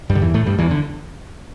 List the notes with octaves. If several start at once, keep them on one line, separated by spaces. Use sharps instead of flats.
G2 G3
D3
E2 E3
A2 A3
G2 G3
E2 E3
D3